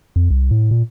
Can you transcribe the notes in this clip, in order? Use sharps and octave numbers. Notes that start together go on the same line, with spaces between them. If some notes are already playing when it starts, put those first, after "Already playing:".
F2
C2
A2
A#2